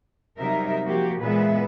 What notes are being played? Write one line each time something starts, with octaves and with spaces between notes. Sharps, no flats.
C3 F#3 G3 D#4 A#4 E5
F3 A#3 F#4 G4
A#2 E3 G#3 B3 B4 E5